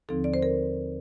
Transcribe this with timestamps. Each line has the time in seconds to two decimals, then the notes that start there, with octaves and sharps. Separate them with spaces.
0.09 D#2 D3 F3 C4 D#4 A4
0.24 D5
0.34 C5
0.43 A#4